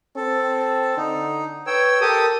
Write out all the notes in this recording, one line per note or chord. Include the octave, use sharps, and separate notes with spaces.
C4 A4
D3 D#4
B4 C#5 G5 E6
G4 A4 A#4 D#6